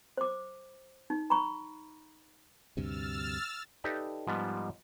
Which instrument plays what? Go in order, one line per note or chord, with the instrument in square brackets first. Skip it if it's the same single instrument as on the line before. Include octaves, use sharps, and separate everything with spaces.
[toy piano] C5 D6
D#4
A#5 B5 C#6
[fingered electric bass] D2 G2 C3 [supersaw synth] E6 F6 A6
[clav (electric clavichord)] D#4 G4 A4 B4 D5 E5
G#2 F3 G3 B3